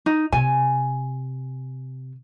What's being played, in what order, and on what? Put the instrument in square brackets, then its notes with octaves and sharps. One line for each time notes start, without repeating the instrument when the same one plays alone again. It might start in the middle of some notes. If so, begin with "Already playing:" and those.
[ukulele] D#4
[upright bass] C3 [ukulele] G#5